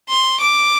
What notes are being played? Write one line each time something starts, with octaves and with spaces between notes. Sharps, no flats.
C6
D6